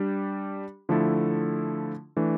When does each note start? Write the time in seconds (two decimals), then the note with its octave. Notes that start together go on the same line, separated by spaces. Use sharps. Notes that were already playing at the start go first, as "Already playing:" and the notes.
Already playing: G3 D4 G4
0.89 D3 F3 A3 E4 A4
2.17 E3 A3 D4